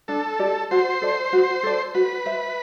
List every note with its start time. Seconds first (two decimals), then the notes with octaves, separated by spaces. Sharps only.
0.08 D4 A4
0.39 G4 D5
0.71 F#4 C5
1.02 A4 D5
1.33 F#4
1.63 A4 D5
1.95 F#4 B4
2.26 C5 E5